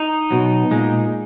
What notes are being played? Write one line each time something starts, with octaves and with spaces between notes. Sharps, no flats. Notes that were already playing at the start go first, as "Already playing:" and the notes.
Already playing: D#4
B2 F#3
A#2 G#3